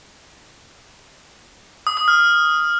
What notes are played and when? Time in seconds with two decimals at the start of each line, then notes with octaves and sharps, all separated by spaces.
1.87 D#6
1.97 D#6
2.08 F6